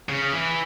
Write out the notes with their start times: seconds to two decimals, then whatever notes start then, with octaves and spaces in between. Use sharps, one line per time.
0.09 C#3
0.33 E3